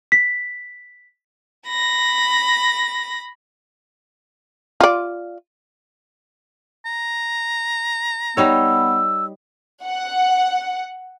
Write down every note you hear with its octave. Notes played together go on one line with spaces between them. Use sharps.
B6
B5 A#6
F4 D5
A#5
G3 B3 D#4 C#5 E6
F#5